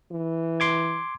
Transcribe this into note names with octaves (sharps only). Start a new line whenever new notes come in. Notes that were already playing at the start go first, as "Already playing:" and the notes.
E3
C6 D6 G#6